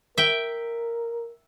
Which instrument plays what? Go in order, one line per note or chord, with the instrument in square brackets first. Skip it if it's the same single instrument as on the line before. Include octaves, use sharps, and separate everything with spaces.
[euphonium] A#4 [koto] E5 G5